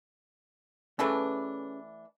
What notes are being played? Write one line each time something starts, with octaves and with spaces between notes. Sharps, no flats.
E3 A3 C#4 D4 G#4 B4